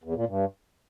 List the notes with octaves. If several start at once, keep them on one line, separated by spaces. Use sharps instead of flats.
E2
A#2
G2